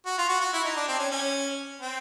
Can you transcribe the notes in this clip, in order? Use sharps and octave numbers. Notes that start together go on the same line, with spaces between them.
F#4
F4
F#4
F#4
E4
D#4
D4
C4
C#4
C#4
C4